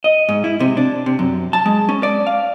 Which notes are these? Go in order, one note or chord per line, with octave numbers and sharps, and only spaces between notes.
D#5
G#2
E4
C3
D4
C3
F#2
A5
G#3
C#4
D5
F5